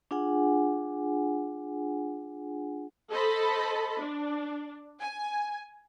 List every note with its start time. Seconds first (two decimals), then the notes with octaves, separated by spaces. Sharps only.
0.11 D4 F4 G#4 F#5 G#5
3.11 A4 C5 D#5 A5 B5
4.01 D4
5.00 G#5